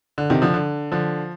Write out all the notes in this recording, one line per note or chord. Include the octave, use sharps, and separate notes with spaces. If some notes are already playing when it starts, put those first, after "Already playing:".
D3
C3 D#3
D3 F3
D3
D3 F3